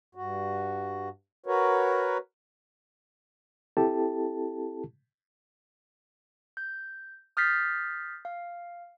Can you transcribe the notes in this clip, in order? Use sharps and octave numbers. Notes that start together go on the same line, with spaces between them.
G2 F#4
F#4 A#4 B4 C#5
C4 E4 G4 A4 A5
G6
D#6 F6 G6 A6 B6 C7
F5